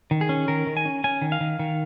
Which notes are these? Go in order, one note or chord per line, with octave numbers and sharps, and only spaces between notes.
D#3
G#4
C#4
D#3 A#4
D#3
G#5
C#4
C#4 G#5
D#3
F5
D#3
D#3